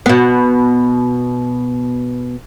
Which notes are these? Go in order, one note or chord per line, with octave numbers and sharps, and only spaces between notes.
B2 B3